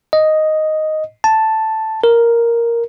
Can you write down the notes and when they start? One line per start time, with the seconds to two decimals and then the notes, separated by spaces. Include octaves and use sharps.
0.13 D#5
1.24 A5
2.04 A#4